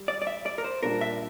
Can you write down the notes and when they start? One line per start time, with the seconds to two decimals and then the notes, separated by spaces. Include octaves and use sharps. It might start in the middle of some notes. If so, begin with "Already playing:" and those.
Already playing: G3
0.08 D5
0.22 D5
0.27 E5
0.46 D5
0.58 A#4
0.64 C5
0.83 A#2 G3 D4 A#4
1.01 E5